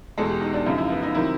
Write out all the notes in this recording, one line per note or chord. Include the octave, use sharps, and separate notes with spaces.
E2 B2 G#3 A4
G4
D#4
D4
F#2 C#3 F3 D#4
E4
B3
D#4
C3 D#3 F#3 E4